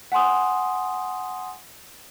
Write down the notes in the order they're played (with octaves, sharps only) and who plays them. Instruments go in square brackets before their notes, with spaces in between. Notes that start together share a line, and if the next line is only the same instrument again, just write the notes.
[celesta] F#5 G#5 C6 D#6